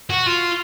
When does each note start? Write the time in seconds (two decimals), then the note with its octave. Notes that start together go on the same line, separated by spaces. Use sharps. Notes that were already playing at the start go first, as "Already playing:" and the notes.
0.10 F#4
0.26 F4